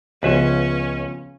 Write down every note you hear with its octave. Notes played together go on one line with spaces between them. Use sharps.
C#2 C#3 F3 B3 C#4 B4 E5